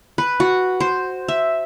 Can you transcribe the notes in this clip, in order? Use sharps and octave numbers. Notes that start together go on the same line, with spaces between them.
B4
F#4
C5
E5